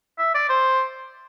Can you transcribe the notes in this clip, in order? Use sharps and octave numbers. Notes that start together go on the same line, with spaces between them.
E5
D5
C5